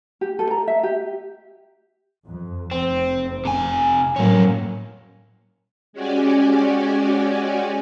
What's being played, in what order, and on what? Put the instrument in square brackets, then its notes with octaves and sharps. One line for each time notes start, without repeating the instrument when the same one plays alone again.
[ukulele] G4
A4
A#5
E5
G4
[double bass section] F2
[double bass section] F1 [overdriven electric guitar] C4
[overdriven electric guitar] C3 G#5
[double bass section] A2 F#3 [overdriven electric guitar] A#3 C#4
[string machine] G#3 C#4 F#4 G4 D5 G#5